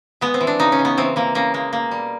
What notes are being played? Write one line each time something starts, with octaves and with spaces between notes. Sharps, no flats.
G#3 B3
C4
E3
D4
C#3 D#4
C#4
C#3
B3
E3 C4
E3 A#3
C#3 A#3
G#3 A#3
B2 A#3
G3